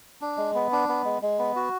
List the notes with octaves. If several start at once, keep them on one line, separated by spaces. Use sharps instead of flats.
D4
G#3
B3
D4
B3
G#3
G#3
B3
F#4